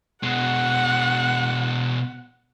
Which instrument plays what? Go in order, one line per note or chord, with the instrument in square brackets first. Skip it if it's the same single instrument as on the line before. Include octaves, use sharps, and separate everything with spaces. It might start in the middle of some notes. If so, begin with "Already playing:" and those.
[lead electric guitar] B2 G#3 [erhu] F#5